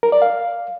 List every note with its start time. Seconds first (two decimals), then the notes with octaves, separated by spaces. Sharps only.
0.03 A#4
0.12 D5
0.22 F5